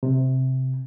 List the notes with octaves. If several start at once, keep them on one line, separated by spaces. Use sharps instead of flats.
C3